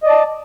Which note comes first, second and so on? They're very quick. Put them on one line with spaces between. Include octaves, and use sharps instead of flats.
D#5 D5 A5